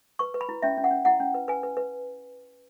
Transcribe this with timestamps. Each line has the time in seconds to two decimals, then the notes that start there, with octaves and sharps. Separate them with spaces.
0.19 B4 C#6
0.34 B4
0.41 B5
0.49 E4
0.62 C#4 E5
0.77 C#4
0.84 F#5
0.91 C#4
1.05 E4 F#5
1.20 C#4
1.34 B4
1.48 B4 G#5
1.63 B4
1.77 B4